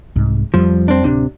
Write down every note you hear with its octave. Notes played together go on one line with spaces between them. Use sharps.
C2 G#2
F2 F3 G3
C4 D4
D1 C3 D4